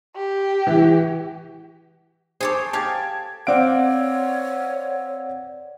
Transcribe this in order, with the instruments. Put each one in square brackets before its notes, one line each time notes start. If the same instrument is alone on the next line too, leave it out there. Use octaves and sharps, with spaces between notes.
[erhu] G4
[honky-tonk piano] E3
[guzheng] G#4 A4 C#5 [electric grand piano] C5 D6
[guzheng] G4 F5 [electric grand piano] A5 D6 G#6
[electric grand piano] C4 F5 D7 [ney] C#5 [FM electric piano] D5 F#5